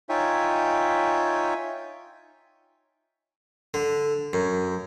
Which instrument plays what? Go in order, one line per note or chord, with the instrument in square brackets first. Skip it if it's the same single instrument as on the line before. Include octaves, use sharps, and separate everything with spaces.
[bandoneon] D#4 F4 C#5 E5 G5 G#5
[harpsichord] D3
F#2